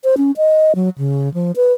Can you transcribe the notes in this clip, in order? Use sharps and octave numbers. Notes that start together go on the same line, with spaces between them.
C5
C#4
D#5
F#3
C#3
F3
B4